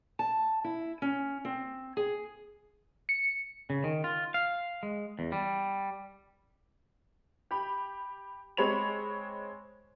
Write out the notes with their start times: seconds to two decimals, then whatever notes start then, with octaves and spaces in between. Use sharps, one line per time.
0.19 A5
0.64 E4
1.02 C#4
1.45 C4
1.97 G#4
3.09 C#7
3.70 C#3
3.84 D#3
4.04 F4
4.34 F5
4.83 G#3
5.19 E2
5.32 G3
7.51 G4 B5
8.57 G#3 C4 C#5 B5 F7